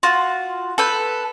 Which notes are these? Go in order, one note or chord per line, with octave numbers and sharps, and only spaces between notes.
F4 F#4
A4 B4 G6